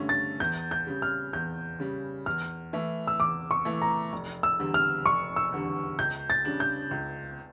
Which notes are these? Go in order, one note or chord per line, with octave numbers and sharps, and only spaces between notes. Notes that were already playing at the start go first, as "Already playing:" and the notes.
Already playing: G2 D3 A3 C#4
A6
E2 G6
G6
C#3 G3
F6
E2 G6
C#3 G3
E2 F6
E3 A3 E4
E6
E2 D6
C#6
E3 A3 E4
A#5
F1
E6
E2 D3 G3
F6
F1 C#6
E6
E2 D3 G3
C#2 G6
A6
C#3 G3 D4
G6
C#2